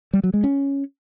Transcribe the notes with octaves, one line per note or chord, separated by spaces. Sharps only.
G3
F#3
G#3
C#4